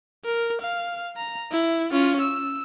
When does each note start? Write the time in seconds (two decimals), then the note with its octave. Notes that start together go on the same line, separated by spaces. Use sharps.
0.25 A#4
0.62 F5
1.17 A#5
1.51 E4
1.92 C#4 F4
2.21 E6